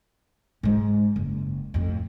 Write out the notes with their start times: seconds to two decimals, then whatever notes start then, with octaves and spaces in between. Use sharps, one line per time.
0.63 G#2 G#3
1.16 F#1
1.74 F2 A2